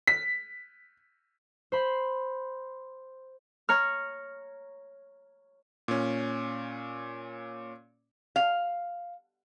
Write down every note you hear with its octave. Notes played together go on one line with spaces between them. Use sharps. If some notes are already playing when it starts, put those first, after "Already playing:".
B6
C5 B5 C6
C#5 A#5 F6
A#2 C#4
F5